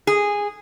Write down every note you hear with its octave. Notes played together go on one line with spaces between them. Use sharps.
G#4